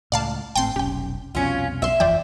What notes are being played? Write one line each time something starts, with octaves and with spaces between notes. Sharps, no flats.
C#2 A2 D5 F5 A5
G#1 A2 C4 G5 A5 C6
F1 B1 C#4 G4 G5
C2 F2 B2 C#4 F4
B1 E5 C6
F#1 E2 F3 C5 D5 G5